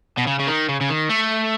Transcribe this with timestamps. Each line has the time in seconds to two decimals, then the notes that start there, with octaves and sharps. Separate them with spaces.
0.18 B2
0.27 C#3
0.40 C#3
0.48 D#3
0.69 C#3
0.81 C#3
0.89 D#3
1.09 A3